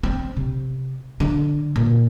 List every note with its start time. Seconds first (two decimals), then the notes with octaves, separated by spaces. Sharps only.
0.03 C4
0.37 C3
1.20 D3
1.76 A#2